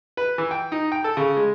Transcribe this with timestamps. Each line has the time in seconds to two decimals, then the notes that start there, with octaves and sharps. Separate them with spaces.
0.17 B4
0.38 E3
0.51 G5
0.72 D#4
0.92 G5
1.04 A4
1.17 C#3
1.37 G#3